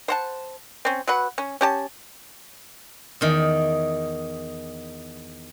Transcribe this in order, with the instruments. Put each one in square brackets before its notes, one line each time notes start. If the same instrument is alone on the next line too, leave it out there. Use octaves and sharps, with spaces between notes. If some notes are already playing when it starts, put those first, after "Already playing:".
[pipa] C5 F#5 A5
C4 C#4
F#3 B4 F#5
C#4
C#4 G4 A5
[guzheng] E2 D#3